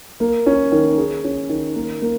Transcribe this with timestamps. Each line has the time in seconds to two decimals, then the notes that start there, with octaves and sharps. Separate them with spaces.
0.20 A#3
0.46 C#4
0.72 D#3
0.98 G#4
1.24 C#4
1.49 D#3
1.75 A#3
2.02 A#3